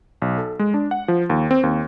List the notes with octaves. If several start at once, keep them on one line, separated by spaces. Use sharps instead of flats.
B1
A4
G#3
D4
F#5
F3
D#2
C4
D#2